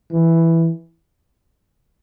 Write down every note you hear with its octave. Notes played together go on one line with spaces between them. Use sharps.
E3